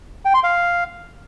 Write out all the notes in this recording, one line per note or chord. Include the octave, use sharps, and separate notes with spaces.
G5
C6
F5